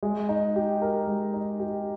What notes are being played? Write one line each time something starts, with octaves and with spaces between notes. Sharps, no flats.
G#3
D#4
G4
A#4
G#3
D#4
G4